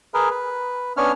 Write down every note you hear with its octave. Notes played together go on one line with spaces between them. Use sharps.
G#4 A#4 B4
B4
B3 C#4 D4 C#5 F6